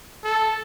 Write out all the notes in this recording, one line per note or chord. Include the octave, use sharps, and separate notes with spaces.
A4